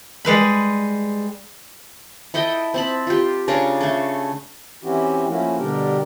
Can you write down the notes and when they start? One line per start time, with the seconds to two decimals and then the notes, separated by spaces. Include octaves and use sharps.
0.25 G3 G#3 B4 B5
2.34 E4 A4 D#5 G5
2.74 C4 A5 B5
3.07 F4 G4
3.48 C#3 C#4 D4 A#4
3.81 A3 A4
4.84 E3 C4 C#4 E4 F#4 G4
5.28 F3 A3 A#3 C#4 E4 F#4
5.57 B2 D3 G3 D4 G4 A#4